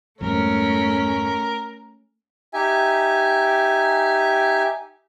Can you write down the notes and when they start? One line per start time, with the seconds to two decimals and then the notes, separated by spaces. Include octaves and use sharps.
0.21 G#1 F2 G3 A3 C#4 A#4
2.53 D#4 G4 E5 G#5